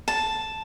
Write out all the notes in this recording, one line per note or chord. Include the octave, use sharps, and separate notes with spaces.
A5